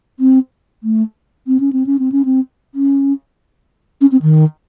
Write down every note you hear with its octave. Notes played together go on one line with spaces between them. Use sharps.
C4
A3
C4
C#4
C4
C#4
C4
C#4
C4
C#4
C#4
C4
D#3